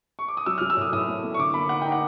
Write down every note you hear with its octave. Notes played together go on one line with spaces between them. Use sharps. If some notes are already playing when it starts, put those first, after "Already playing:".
C#6
D6
D#6
F#3 E6
F#3 F6
E6
A2
D#6
A2 D#6
A3
A3
C#6
D3 D6
A#3 B5
D#4 F#5
D#4 G5
F#5